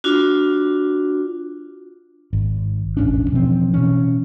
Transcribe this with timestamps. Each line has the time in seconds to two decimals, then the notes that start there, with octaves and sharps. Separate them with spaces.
0.04 D4 F4 F#4
2.33 G#1
2.97 E1 A1 C#4 D4
3.32 B2 E3 F3 C4
3.74 B2 E3 C#4